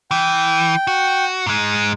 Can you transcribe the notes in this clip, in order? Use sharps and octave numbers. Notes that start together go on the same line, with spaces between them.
E3 G5
F#4
G#2 G#3